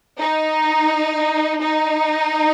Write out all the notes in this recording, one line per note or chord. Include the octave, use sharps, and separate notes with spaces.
D#4
D#4